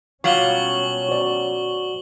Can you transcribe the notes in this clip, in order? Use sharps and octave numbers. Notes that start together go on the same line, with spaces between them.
B2 F#3 G3 C#4 F4 C#6 F#7 G7
F#4 C5 D5